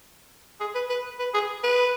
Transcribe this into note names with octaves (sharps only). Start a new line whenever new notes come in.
G#4
B4
B4
B4
G#4
B4